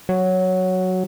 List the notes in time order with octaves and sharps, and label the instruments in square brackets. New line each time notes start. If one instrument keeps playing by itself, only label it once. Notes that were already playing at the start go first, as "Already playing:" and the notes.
[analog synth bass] F#3